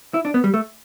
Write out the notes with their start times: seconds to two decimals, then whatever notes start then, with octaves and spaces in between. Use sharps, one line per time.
0.14 E4
0.25 D4
0.34 B3
0.44 G3
0.54 A3